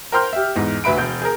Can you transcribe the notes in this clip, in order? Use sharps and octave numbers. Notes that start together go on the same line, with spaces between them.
A#4 C5 G5 C6 F6 G6
G4 E5
E2 G#2
D2 B4 E5 B5 D7
E1 G6
G#4 A#4